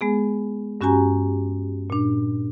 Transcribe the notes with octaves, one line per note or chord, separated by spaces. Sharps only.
G#3 B3 G#4
G2 C#4 F#4 G4 G#5 A#5
A#2 D4